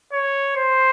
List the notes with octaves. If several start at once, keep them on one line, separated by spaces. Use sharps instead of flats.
C#5
C5